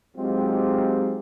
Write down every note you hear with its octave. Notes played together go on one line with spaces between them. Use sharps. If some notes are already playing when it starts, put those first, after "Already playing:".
F#3 G#3 C4 D#4 F4 G4